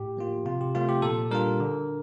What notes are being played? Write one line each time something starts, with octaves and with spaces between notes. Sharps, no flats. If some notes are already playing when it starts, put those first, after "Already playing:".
Already playing: A2 G4
F3 A#3 F4
C3 F4
G4
F3 A3 C4 F4
G4
A#2 A4
G3 D4 F4 A#4
D3